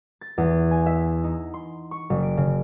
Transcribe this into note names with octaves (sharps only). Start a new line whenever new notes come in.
A6
E2
G#5
E5
D#4
C6
C#6
F#1
D7
C#3